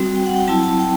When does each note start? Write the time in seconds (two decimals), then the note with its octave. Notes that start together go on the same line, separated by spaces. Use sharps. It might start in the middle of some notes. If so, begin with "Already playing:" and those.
Already playing: G3 C4 F#4
0.16 G5
0.26 F#5
0.36 G5
0.48 F#3 C4 E4 A5
0.63 A5
0.79 G5